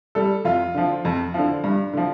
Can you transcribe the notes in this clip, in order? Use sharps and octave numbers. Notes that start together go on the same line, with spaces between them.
G3 A4
F2 F4
D3 F3
F2
D3 F3
G2
D3 F3